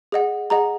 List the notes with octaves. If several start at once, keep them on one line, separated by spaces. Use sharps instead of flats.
G#4 D#5 F#5
G#4 D#5 F#5 A#5